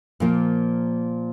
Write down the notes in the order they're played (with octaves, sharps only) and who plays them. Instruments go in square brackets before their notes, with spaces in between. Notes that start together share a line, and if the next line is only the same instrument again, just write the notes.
[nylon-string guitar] A#2 F3 A#3